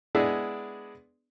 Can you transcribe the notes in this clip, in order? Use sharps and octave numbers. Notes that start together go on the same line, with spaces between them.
G#3 B3 D4 E4 G#4